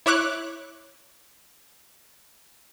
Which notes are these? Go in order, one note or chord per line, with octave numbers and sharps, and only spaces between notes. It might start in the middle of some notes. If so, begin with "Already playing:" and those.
E4 C#5 D6 F#6